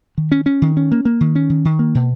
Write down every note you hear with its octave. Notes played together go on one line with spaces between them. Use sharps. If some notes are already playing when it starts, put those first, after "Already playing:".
D#3
C#4
C#4
D#3
C#4
A#3
A#3
D#3
C#4
D#3
D#3
A#3
B2